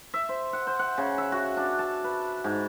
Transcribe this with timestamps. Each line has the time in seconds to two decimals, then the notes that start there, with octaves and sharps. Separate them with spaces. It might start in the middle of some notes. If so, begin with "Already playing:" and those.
0.14 E5
0.29 C5
0.53 F#5
0.67 C5
0.79 F#5
0.98 C#3
1.18 E5
1.32 F#4
1.57 D4
1.79 A5
2.04 B4
2.44 G#2